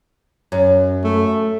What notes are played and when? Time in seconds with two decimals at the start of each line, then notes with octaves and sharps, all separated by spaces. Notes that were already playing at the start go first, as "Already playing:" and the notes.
0.52 F#2
1.04 A3